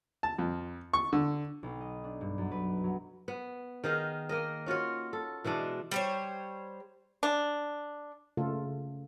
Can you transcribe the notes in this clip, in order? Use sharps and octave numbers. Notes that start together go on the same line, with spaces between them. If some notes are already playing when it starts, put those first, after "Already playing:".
A5
F2
C#6
D3
B1
D#5
D4
G2
F#2
B4
F#3
B3
D#3 D#4 G#4 F5
A#3 A#4 D#5
C#4 F4 F#4 C#5
A4
B2 E3 G#3 D4
G3 C5 C#5
D4
C#3 A3 F4 A4